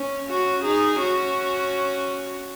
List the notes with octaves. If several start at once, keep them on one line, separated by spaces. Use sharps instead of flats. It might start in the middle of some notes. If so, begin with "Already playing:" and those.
Already playing: C#4
C#4 F#4
D#4 G#4
C#4 F#4